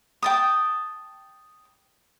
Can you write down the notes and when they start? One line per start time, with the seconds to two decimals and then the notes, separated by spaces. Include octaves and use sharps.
0.22 G5 A5 D#6